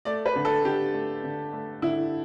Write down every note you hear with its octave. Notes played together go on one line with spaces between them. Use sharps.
A3 D5
B4
D3
A4
D3 G4
A3
D3
A3
D3 E4